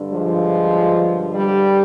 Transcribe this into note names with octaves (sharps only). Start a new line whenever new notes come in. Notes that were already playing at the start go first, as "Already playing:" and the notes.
Already playing: G2 D3
F3 G#3
G3